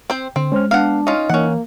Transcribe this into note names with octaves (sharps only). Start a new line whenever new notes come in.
C4 C5
D3 C4
G#3 C#4 C5 F6
B3 D4 F5 F#5
C#4 D#4 F4 D#5
E3 A#3 C#4 F#5